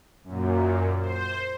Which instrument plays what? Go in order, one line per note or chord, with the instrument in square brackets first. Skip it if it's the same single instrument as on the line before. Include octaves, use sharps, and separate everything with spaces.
[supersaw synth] F#2 A#2
C5